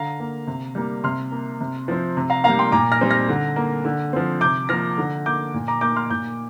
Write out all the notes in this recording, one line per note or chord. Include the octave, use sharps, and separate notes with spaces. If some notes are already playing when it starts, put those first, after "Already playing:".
Already playing: D3 F5 A#5
A#3
C3
G3 A#3
C3 C6 F6
A#3
C3
F3 C4
C3
F5 A#5
G3 A#3 F5 A#5
G5 C6
A#2 A#5 D6
F6 A#6
G3 C4
F6 A#6
D3
A#3
D3
F3 C4
C3 D6 G6
F3 A#3 F6 A#6
D3
A#3 D6 G6
A#2
A#5 D6
A#3 D6 G6
C6 F6
A#2 D6 G6